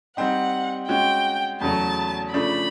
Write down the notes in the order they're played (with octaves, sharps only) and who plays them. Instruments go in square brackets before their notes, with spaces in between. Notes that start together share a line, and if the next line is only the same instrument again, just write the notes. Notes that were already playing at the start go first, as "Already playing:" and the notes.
[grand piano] G3 C4 D#4 [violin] F#5
[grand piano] G#3 C#4 F#4 [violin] G5
[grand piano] E2 C#3 F#3 A3 [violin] A5
[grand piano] C#3 F3 A3 D4 [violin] B5